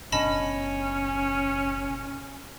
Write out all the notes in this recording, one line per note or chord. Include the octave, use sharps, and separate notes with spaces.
F#1 B2 C#4 D4 D#5 A5 B5